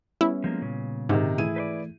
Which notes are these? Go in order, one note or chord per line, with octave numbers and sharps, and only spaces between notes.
G3 B3 C#4 E4
F3 G#3 A#3
A#2 C#3
G#2 C3 D#3
E3 A3 E4 G#4 D#7
B4 C5 D5